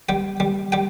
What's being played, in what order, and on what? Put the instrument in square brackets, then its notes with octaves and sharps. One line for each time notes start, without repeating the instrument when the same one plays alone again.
[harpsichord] G3 G5
G3
G3 G5